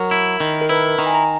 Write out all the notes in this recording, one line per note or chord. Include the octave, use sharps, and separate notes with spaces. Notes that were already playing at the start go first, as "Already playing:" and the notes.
Already playing: F#3 A#4
E4
D#3
A#4
E4 B4
D#3 A#5
G#5
A#5